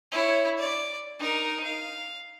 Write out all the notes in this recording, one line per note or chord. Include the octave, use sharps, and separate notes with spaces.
E4 C#5
D5
D#4 A#4
F5